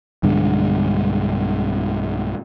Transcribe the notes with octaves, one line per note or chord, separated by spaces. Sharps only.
B1 G2 D3 G#3